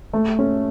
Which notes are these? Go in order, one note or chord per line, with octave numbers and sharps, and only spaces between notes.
A3
C#4